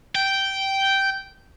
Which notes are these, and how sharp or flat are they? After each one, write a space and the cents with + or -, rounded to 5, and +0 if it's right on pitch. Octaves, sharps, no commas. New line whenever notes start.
G5 -10